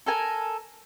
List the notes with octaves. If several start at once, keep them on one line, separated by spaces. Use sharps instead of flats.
A4 A#4 G#5